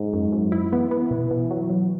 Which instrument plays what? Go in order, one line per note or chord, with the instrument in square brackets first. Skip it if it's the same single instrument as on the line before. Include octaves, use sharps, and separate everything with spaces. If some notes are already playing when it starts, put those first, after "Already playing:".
Already playing: [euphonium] G#2
[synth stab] F#2
F#2
E4
[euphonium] E3 [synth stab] B3
[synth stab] B3
B2
B2
F#3
F#3